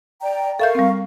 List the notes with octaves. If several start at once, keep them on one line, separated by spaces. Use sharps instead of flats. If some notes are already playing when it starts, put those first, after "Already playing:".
D5 G5 A#5
A4 A#4 E5 F5 C#6 G6
G3 C4